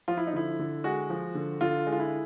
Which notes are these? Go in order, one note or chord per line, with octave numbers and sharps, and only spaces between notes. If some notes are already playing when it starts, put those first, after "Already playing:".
F3 F4
E4
D#4
D3 E4
D3
G#3 F#4
F3
D3
D3 F4
G#3
F4
E4